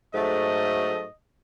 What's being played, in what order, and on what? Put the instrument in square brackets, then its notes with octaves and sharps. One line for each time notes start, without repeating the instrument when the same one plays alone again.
[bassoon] G#2 [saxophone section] F#3 A3 [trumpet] D#5